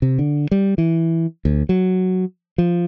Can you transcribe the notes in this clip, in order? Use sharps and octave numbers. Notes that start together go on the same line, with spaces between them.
C3
D3
G3
E3
D2
F#3
F3